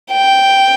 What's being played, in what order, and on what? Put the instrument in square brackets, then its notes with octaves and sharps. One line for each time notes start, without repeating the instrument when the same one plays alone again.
[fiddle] G5